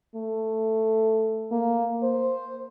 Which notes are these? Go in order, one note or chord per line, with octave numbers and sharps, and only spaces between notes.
A3
A#3
C5